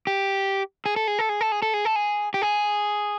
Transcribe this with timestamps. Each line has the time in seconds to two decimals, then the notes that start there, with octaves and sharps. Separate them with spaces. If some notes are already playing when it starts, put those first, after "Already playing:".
0.07 G4
0.86 G#4
0.96 A4
1.08 G#4
1.19 A4
1.29 G#4
1.41 A4
1.52 G#4
1.62 A4
1.74 G#4
1.85 A4
1.96 G#4
2.34 G4
2.42 G#4